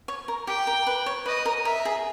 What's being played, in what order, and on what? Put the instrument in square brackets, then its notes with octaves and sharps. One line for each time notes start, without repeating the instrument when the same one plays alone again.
[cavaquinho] C#5
A#4
[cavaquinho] G4 [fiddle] G5
[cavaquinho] A#4
B4
C#5
[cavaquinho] B4 [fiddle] D#5
[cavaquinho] A#4
[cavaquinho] A#4 [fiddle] E5
[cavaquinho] G#4